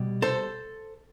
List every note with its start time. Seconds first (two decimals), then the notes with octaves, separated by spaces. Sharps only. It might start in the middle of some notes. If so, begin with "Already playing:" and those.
Already playing: B2 G3
0.22 A4 C5